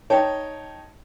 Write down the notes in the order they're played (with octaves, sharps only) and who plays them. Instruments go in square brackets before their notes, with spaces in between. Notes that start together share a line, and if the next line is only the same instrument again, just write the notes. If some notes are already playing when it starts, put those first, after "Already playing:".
[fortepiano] D#4 C#5 G5 A5